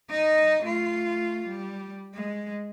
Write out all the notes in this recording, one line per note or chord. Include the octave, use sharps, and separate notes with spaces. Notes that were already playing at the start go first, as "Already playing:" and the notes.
D#4 D#5
A3 F4
G3
G#3